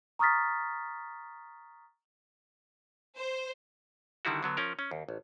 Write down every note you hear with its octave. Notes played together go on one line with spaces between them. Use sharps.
A#5 C#6 D#6 F6 A6 B6
C5
D3 D#3 G3 E4 F#4
D3 F#3 B3
F3 C#4 A#4
C#4
D#2
A1